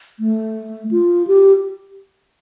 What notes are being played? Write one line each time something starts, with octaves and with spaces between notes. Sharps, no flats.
A3
F4
G4